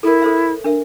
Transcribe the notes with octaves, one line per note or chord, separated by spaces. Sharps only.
E4 A4 A#4
A4 C5 E5
D4 A#4 E5